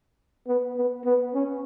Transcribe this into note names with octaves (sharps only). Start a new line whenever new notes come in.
B3
B3
B3
C#4